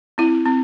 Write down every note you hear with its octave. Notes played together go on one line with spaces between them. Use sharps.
C4 E4
C4